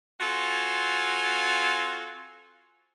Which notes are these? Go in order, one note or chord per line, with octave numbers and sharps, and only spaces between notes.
C4 F4 F#4 A4 F5 G#5